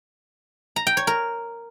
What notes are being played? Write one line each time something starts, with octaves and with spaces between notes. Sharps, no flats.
A#5
G5
C#5
A#4